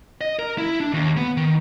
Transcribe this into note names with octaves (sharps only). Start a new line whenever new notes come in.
D#5
A#4
E4
D4
D#2
B3
D#3